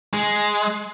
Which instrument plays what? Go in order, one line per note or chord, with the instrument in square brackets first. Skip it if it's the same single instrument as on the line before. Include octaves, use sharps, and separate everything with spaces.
[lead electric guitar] G#3